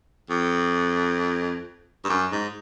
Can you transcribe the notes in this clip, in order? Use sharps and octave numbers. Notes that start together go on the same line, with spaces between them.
F2
G2
F#2
G#2